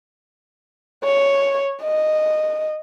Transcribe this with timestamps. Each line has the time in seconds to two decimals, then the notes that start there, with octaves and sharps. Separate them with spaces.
1.04 C#5
1.83 D#5